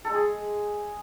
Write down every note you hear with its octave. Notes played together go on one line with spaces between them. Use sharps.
A4
G#3
G#4